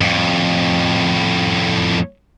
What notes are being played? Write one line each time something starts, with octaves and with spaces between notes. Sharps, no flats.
F2 A2